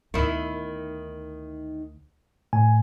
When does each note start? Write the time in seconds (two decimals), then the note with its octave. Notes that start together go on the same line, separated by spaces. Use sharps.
0.14 D2 D#3 B3 E4
2.53 A2 G#5